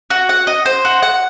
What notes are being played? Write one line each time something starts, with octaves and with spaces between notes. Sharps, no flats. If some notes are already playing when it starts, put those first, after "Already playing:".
F#4
F#5
D#5
C5
F#4
F#5